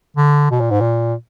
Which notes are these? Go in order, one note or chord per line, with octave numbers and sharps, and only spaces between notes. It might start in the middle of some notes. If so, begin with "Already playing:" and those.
D3
B2
A#2
G#2
A#2